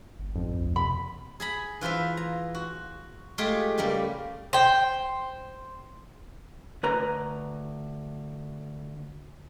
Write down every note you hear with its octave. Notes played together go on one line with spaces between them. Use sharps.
G1
F2 G#2
A#1
D2
C3 B5
G#4 A#5 B5
E3 F4 B4 C5 E5
A#5
F#4
G#3 A3 F4 G4 G#4 G5
C#3 G3 A3 A#3
C5 G5
D2 B4 A#5